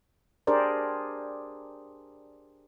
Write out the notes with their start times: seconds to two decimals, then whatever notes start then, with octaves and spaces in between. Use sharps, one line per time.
0.47 D4 G4 G#4 A#4 C5 D5